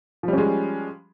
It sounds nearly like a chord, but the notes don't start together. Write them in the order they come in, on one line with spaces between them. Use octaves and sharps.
F3 G3 C#4 G#3